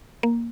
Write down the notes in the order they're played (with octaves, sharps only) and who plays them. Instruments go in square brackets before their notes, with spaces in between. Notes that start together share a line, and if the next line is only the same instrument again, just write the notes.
[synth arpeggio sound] A#3